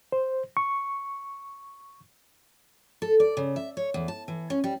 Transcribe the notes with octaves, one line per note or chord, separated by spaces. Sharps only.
C5
C#6
A4
D5
C#3
E5
C#5
E2
A5
E3
C#4
G3